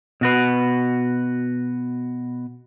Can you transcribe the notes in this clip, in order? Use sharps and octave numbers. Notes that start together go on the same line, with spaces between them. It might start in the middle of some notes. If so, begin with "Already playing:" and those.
B2 F#4 B4